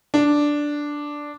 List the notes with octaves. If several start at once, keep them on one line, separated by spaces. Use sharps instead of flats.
D4